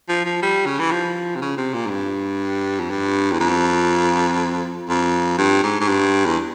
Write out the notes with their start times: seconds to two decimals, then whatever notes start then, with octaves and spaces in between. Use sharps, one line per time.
0.09 F3
0.25 F3
0.42 G3
0.66 C#3
0.79 E3
0.91 F3
1.36 C3
1.42 C#3
1.57 C3
1.74 A#2
1.86 G#2
1.90 G2
2.80 F2
2.91 G2
3.32 E2
3.40 F2
4.89 F2
5.38 G2
5.63 G#2
5.80 G#2
5.89 G2
6.25 E2